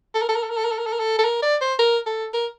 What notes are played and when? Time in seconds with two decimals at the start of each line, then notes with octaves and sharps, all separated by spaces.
0.15 A4
0.22 A#4
0.28 A4
0.36 A#4
0.43 A4
0.50 A#4
0.57 A4
0.65 A#4
0.71 A4
0.78 A#4
0.86 A4
0.93 A#4
1.00 A4
1.18 A4
1.25 A#4
1.42 D5
1.61 C5
1.79 A#4
2.06 A4
2.34 A#4